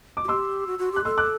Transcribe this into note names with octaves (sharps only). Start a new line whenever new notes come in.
D6
F#4
G4 C6 E6
F#4
F#4
G4 F#6
A4 C6 E6
D6 F#6